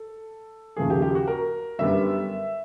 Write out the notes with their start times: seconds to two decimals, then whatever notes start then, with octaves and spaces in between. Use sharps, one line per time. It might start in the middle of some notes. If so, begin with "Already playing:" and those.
Already playing: A4
0.77 D#2 C#3 F3 A3 G#4
0.90 G4
1.02 G4
1.15 F#4
1.27 A#4
1.79 F#2 D3 G3 B3 E5